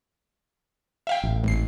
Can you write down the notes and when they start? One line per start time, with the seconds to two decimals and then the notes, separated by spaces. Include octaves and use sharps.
1.07 E5 F5 G5
1.23 A1
1.44 G#1 C7